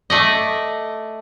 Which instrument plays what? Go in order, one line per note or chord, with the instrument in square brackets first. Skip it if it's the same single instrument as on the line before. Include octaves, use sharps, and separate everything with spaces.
[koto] A3 D5 D#5